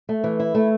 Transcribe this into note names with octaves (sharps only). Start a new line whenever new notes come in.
A3
E3
E4
A3